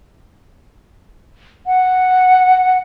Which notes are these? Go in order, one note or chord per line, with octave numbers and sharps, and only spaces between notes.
F#5